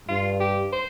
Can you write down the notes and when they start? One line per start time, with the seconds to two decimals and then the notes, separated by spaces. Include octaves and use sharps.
0.08 G2 F4
0.40 G4
0.72 C5